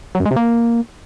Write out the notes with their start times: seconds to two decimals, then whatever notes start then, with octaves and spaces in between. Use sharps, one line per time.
0.15 F#3
0.20 F#2
0.26 G#3
0.31 C3
0.36 A#3